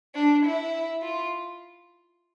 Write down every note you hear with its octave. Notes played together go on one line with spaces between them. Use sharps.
D4
E4
F4